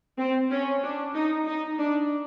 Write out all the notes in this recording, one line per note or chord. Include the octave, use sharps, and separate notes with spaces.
C4
C#4
D4
D#4
D#4
D4